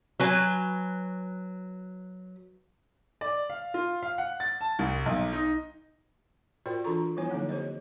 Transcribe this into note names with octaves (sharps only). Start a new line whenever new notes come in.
F#3 B4 G#5
D5
F5
F4
F5
F#5
A6
A5
C2
B1
D#4
F4 F#4 A#4 C5 D5 G5
E3 D4 F4 A4 A#5 C#6
F3 G3 B3 E4 C#5 G#5
D3 F#3 A#3 C4 D#4
G4 C5 C#5 D#5